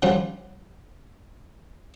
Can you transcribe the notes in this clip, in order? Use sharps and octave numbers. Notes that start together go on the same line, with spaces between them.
D3 F3 G3 C#4 F#4